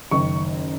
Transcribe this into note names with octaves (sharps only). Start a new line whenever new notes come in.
F#1 F#2 D#3 C#6